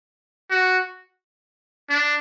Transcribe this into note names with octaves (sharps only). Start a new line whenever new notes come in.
F#4
D4